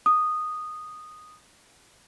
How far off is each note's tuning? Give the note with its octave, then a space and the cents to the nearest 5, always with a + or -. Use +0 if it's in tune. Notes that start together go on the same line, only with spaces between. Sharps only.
D#6 -10